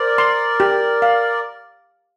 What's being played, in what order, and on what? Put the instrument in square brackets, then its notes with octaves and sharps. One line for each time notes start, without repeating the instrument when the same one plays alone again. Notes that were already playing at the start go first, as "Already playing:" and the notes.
Already playing: [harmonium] A#4 D5 [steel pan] C5
[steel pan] C6
G4
F5